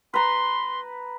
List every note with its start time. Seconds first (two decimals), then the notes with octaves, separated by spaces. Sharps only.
0.14 B4 A#5 C6